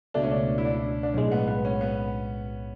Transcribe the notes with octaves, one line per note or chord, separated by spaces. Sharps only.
C#2 B2 A3 D4
C#4
D4
E4
D4
D4
B1 A2 G#3 C#4
B3
B3
C#4
B3